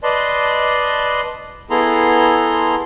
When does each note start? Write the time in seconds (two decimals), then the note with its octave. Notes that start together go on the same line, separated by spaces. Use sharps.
0.03 B4 D5 D#5 A5 C6
1.70 B3 E4 G#4 A4 A#5 C6